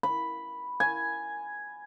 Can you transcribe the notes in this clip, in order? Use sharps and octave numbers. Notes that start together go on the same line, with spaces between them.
B5
G#5